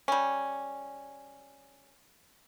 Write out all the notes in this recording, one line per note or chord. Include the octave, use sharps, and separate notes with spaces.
G3 C#4